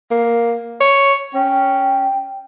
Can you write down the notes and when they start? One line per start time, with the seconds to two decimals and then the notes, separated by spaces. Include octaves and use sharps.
0.11 A#3
0.81 C#5
1.35 C#4 G5